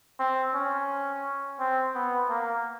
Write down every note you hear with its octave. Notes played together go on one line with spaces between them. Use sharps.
C4
C#4
C4
B3
A#3